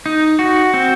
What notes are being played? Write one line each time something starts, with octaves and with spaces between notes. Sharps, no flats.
D#4
F#4
C4